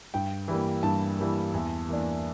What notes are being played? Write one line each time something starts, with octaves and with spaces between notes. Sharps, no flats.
G2 G5
E3 G3 A#3
G2 A5
E3 G3 A#3
E2
E3 A#3 D4